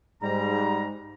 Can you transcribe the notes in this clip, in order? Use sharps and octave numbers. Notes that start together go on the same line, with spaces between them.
G#2 G3 A#5